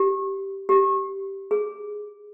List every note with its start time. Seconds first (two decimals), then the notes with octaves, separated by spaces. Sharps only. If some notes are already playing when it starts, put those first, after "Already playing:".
Already playing: G4
0.69 G4
1.51 G#4